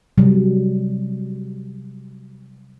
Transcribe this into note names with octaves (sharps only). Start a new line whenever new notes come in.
C3 F#3 G3